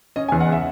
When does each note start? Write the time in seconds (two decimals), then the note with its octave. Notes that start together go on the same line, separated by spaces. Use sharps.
0.16 C#4 D#5
0.29 G#5
0.32 E2
0.41 F#5
0.48 C#3 E5